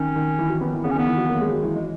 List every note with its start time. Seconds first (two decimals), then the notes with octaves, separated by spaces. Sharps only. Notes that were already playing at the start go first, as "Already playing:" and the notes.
Already playing: D#3 C#4
0.16 D#3
0.39 E3
0.50 F#3
0.61 B3
0.73 E3
0.83 C#3 B3
0.91 C#4
0.95 D#3 B3
1.07 E3
1.17 F#3
1.29 A#3
1.41 G#3
1.52 F#3
1.63 E3
1.75 G#3